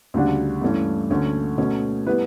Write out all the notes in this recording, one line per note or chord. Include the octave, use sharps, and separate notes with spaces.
D2 C#3 G3 D4 F#4
G2 E3 A3 C#4
D2 D3 A3 C#4
B2 A3 C#4
G3 B3 E4 B4